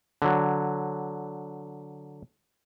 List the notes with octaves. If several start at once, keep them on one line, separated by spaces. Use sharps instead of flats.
D3 F#3